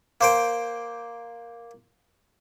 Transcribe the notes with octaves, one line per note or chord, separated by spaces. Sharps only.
A#3 C5 G5